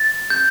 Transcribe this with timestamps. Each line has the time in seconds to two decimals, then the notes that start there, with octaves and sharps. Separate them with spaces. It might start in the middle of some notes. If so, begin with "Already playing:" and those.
Already playing: A6
0.30 G6